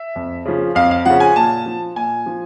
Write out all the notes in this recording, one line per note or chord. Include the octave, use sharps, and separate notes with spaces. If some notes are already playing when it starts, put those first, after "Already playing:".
Already playing: E5
F2
C#3 F3
F2 F5
F5
C#3 F3 F#5
G#5
A#2 A5
F3
A#2 G#5
F3